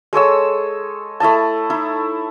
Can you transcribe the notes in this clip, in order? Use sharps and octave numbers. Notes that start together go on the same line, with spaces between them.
G#3 A4 C#5 E6
A3 E4 D#5 A5
D#4 E4